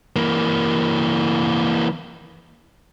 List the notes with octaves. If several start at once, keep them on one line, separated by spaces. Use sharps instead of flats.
E3 A#3